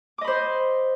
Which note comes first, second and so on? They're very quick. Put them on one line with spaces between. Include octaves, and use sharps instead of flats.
D6 D#5 B5 C5